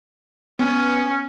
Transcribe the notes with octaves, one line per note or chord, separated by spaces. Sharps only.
B3 C#4